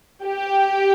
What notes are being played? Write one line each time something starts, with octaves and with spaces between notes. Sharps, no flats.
G4